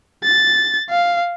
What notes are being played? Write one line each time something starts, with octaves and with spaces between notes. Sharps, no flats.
A6
F5